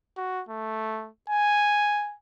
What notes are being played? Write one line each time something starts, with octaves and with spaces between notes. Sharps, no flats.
F#4
A3
G#5